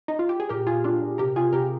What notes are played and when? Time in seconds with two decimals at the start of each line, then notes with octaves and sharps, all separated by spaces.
0.08 D#4
0.19 F4
0.29 G4
0.40 G#4
0.49 A#2 G4 A#4
0.67 A#2 F4 G#4
0.84 A#2 D4 F4
1.02 A#2
1.18 C3 G4 A#4
1.36 C3 F4 G#4
1.53 C3 G4 A#4